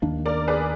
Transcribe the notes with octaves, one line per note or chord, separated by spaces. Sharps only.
D#2 D#3 A#3 D4
A#4 D5
G#4 B4